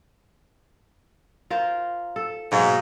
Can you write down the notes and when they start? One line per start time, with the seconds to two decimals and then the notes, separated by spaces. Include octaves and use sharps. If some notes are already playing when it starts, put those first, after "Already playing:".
1.50 F4 A#4 C5
2.16 A4
2.52 G#2 B2 F#3 A#3